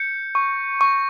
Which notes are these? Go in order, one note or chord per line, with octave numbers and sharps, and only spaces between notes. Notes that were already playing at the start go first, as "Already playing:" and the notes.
Already playing: G6 C#7
C#6
C#6